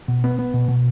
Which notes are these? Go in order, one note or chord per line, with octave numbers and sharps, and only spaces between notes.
B2
B3
B3
B2
B2